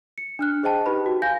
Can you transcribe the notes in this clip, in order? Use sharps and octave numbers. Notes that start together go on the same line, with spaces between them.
C#7
D4 F6 F#6
G#4 C5 D#5 G5 A5
D#4 G4 B4 B5
F#4
F5 G#5 G6 A#6